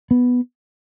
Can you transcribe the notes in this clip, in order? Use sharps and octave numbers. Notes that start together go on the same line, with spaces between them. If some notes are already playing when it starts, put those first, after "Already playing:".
B3